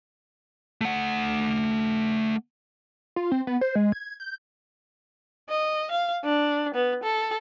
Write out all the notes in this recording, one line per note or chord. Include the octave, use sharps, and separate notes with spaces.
A3 F#5
F4
C4
B3
C5
G#3
G#6
G6
D#5
F5
D4
B3
A4